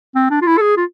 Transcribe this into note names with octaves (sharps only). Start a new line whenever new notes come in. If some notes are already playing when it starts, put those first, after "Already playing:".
C4
D4
F4
E4
A4
G#4
F4